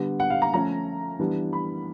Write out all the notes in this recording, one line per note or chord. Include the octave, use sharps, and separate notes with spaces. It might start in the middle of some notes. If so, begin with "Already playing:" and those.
Already playing: D3 G3 B3
F#5
F5
A#5
F3 A3 C#4 A#5
E3 G3 B3 D4
B5